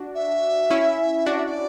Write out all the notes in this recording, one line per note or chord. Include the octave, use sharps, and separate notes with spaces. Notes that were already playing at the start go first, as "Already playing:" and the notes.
Already playing: D4 F#4
E5
C#4 E4
D4 F#4 D5
E5
D5